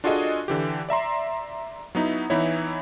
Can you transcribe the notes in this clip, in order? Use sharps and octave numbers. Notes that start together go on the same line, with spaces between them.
D4 F4 F#4 G#4 A4 D#5
D3 E3 G4
D5 E5 A#5 C6
F#3 B3 D#4 E4
E3 B3 D#4 E4 C#5